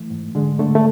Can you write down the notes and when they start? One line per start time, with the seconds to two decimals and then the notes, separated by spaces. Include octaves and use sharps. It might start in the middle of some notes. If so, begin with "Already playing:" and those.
Already playing: E3 A3
0.10 G#2
0.35 D3 G#3
0.59 D3 A3
0.75 A3